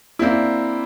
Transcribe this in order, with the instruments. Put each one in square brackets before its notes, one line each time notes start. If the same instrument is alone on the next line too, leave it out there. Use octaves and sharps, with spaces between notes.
[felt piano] A#3 C4 D4 E4